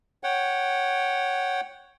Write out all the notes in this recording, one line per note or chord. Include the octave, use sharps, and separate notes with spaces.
C#5 F#5 G5